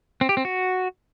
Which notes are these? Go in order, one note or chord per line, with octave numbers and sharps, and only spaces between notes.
C4
G4
C4
F#4